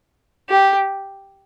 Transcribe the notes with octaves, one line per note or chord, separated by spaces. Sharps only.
G4